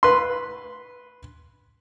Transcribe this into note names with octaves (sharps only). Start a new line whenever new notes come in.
B4 C6